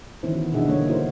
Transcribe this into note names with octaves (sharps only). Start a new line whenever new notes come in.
D#3 E3 B3 C#4 E4 C5
F#4
B2 D4 D#4 G#4 E5 F#5
D3 G3 A#3 C#5
D#4 E4 F#4 A#4 C5